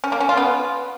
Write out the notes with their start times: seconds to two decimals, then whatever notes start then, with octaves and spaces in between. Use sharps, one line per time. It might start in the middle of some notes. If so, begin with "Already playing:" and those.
0.04 C#4
0.12 A#3
0.20 C#4
0.29 F4
0.37 B3